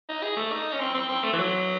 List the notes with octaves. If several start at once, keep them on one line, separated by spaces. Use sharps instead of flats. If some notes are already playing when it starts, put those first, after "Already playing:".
D#4
G#4
A3
D#4
C#4
C4
C4
C4
A3
E3
F#3